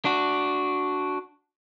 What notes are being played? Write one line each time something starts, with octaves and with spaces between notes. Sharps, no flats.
D4 F#4